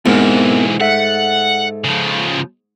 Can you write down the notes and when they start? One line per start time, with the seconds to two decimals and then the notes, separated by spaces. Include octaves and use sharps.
0.06 B1 G#2 E3 B3 C4 A#4
0.81 A4 E5 F#5
1.84 C#3 F3